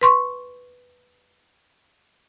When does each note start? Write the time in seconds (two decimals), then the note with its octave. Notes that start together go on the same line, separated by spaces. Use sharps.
0.01 B4 C6 C#6